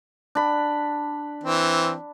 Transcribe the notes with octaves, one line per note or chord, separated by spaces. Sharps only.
D4 B5
E3 C4